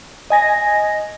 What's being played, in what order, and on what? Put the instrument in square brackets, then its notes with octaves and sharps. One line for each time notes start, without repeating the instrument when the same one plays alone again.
[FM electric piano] D#5 G#5 A#6